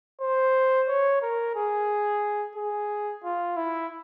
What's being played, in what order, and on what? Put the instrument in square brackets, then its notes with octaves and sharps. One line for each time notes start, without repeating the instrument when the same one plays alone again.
[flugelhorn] C5
C#5
A#4
G#4
G#4
F4
E4